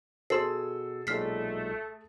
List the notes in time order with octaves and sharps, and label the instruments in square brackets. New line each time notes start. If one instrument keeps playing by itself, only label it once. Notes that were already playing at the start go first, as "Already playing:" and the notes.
[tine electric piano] B2 E6 [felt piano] G#4 A4 [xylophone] C6 C7
[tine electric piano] B1 A#2 G#3 [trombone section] A3 [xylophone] F6 B6 C7